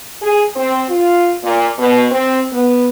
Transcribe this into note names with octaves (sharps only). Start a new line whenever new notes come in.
G#4
C4
F4
A#2
B2
C4
B3